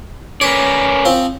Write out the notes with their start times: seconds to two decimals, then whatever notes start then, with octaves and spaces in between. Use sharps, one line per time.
0.41 C#4 A#4 B4 C#5 D5
1.05 F3 C4